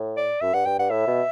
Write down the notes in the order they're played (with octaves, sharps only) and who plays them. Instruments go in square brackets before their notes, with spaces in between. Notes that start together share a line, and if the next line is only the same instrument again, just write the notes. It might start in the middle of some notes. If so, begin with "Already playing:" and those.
Already playing: [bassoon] A2
[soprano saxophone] D5
[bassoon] F#2 [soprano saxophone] E5
[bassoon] G2 [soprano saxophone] F#5
[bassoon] G2 [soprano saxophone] G5
[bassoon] G2 [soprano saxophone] F#5
[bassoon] A2 [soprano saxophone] E5
[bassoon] B2